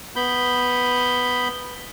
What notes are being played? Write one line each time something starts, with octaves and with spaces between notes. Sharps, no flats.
B3 B5 G6